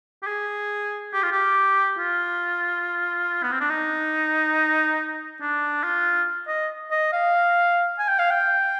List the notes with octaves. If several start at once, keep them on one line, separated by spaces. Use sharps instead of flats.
G4
G#4
G4
F4
G4
F4
B3
C4
D4
D#4
D4
F4
D#5
D#5
F5
G#5
G5
F5
G5